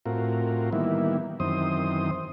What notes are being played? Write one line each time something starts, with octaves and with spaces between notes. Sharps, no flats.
A2 C4 F4 F#4 A#4
D#3 E3 G3 A#3 B3 E4
F#2 D#3 E3 C4 C5 D#6